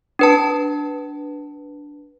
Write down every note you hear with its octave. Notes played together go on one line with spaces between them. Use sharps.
D4 B4 A5